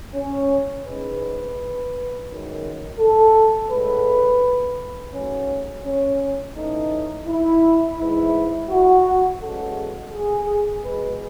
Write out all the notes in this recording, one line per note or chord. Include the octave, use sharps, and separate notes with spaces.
C#4
G#2 E3 G#3 B4
F#2 D#3 G#3
A4
A2 G#3 B4
G#2 F#3 A3 C#4
C#4
A2 E3 A3 D#4
E4
G#2 E3 G#3 E4
F#4
E2 C#3 G#3 A4
G#4
E2 B2 G#3 B4